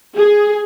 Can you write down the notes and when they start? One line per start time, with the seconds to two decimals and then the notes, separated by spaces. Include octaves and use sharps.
0.16 G#4